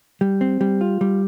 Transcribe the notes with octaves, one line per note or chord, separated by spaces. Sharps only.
G3
C4
G3
F4
G3